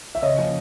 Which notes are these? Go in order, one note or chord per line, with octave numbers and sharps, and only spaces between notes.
E5
C#3 C#5 D#5
F3 A#3 C#4